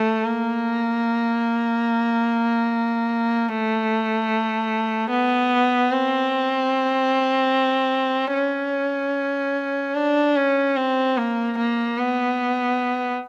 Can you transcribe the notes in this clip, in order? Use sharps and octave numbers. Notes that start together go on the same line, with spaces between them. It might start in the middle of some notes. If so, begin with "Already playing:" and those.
Already playing: A3
A#3
A3
B3
C4
C#4
D4
C#4
C4
A#3
A#3
B3